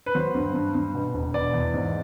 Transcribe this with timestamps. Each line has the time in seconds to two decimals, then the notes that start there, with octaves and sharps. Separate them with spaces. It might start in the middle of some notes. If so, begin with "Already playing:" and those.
0.06 B4
0.15 F#3 C5
0.34 G2
0.54 G2
0.75 G2
0.94 B2
1.14 E1
1.34 B2 D5
1.54 E2
1.74 G#2